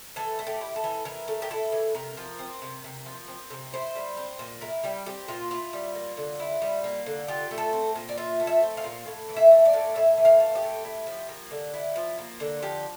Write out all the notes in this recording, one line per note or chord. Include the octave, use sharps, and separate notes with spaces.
E3 A4
A3
G4
E4
A4
E3
E3 A#4
A3
G4
E4 A4
E3
C3 A#4
F3
C4
C3
C3
F3
C4
C3
E4 C5
G3
C4
A#2
E4 A#4
G3 G4
C4 G4
A#2 F4
E4 F4
G3
A#3
D3
E4
G3
A#3
D3
F4 G4
A3
A4
C4
A#2
D5
F4 E5
A3
E5
C4
F5
A#2
A2
E3
E5
A3
D5
A2
A2 E5
E3
F5
A3
G4
A2
E4
F3
A#3
D3
E4
F3
A#3
D3
F3 G4